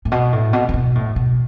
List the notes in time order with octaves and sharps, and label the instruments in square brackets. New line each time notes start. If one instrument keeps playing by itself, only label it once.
[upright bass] A2
B2
A2
B2
C#3
B2
A2
B2